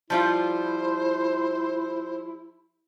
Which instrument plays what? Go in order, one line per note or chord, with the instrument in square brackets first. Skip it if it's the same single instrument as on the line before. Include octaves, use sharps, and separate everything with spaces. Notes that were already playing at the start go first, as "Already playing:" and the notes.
[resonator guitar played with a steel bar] F3 G3 F4 [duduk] E4 [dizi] C5